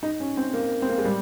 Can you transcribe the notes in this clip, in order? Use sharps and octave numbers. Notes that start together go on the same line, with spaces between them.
D#4
C#4
C4
A#3
C4
A#3
G#3
G3